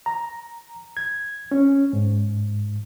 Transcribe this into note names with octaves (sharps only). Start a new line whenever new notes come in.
A#5
G#6
C#4
G#2